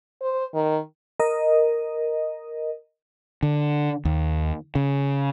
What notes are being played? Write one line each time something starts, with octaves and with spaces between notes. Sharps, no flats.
C5
D#3
A#4 D#5
D3
D#2
C#3